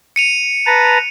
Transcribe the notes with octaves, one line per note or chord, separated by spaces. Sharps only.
C#7 D#7 F7
B4 A5 A#5